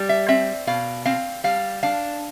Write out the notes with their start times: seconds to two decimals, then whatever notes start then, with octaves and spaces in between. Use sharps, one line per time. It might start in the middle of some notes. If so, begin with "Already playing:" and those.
Already playing: G3
0.09 E5
0.28 C4 E5
0.67 B2 F5
1.05 C4 F5
1.44 G3 F5
1.83 D4 F5